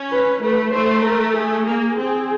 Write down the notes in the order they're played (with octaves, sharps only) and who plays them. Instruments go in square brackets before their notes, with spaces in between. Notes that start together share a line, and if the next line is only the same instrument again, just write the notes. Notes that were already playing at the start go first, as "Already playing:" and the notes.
Already playing: [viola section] C#4
[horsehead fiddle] B4
[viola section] A3 [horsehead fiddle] B4
[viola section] A3 [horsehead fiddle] C5
[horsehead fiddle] A#4
G#4
[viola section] A#3
[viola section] C4 [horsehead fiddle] G#4